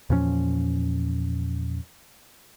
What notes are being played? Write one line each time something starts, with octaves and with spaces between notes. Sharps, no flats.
E2 A#2 F3 C#4